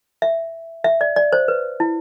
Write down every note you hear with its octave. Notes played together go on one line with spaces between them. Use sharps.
E5
E5
D5
D5
C5
B4
E4